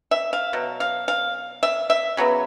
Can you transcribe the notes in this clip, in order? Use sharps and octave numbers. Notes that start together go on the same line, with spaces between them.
E5
F5
B2 F#3
F5
F5
E5
E5
C#3 F#3 B3